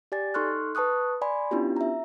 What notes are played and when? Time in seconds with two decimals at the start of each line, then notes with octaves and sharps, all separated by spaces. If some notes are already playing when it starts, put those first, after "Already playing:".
0.12 G4 D5 G#5 A6
0.34 D#4 A4 C6 C#6 F6 F#6
0.75 B4 A5 C#6 D#6 F#6
1.22 D5 G#5 B5 C6
1.51 B3 C#4 D4 E4 F4 G4
1.76 E5 A#5